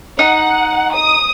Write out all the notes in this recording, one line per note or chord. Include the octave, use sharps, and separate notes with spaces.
D#4 F#5
D#6